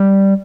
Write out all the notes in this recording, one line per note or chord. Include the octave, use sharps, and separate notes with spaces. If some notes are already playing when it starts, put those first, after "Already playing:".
Already playing: G3